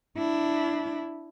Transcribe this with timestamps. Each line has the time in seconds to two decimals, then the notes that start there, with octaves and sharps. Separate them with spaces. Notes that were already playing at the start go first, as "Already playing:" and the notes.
0.17 D4 E4